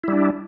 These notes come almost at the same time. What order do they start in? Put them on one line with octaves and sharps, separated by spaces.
E4 G3 D4